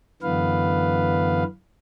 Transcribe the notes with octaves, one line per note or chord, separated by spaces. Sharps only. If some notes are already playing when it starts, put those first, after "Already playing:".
F#2 D3 E3 B3 B4 F5